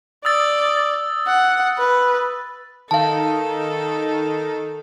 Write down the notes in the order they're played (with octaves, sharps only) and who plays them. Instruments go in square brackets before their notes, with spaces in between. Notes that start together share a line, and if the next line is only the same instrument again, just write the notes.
[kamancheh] D5 [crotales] D#6 E6 A6
[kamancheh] F#5
B4
[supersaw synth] D#3 D#4 [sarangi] A4 [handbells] F5 A5